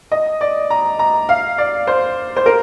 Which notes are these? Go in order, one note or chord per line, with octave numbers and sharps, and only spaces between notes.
D#5
D5
A#5
A#5
F5
D5
C5
C5
A#4